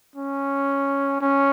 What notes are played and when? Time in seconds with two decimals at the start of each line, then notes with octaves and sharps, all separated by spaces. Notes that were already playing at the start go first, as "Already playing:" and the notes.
0.15 C#4
1.21 C#4